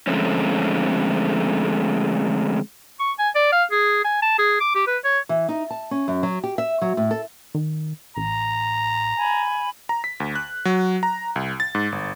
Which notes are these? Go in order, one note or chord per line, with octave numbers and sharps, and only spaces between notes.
D3 F3 G#3 A3 C4 C#4
C#6
G#5
D5
F5
G#4
G#5
A5
G#4
D6
G4
B4
C#5
E3
D#4
A5
C#4
F#2
F#3
G4
E5
F#3
A2
A4
D#3
A1 A#5
G#5 B5
A#5
B6
D2
F#6
F#3
A#5
C2
A6
G#2
G1